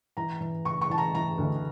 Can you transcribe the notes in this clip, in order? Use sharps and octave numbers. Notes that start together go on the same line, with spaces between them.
E3 A#5
E3
C#3 C#6
C#6
E3 A5
A#5
E3 A#5
D2